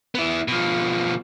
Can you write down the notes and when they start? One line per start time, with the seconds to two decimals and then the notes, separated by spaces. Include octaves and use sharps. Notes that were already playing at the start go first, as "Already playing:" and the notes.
0.15 B3 E4
0.48 B2 F3